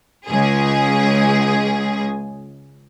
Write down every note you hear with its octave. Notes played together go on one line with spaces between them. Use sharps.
C#2 G#4